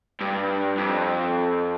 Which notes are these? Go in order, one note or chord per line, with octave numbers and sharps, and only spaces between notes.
G2
F2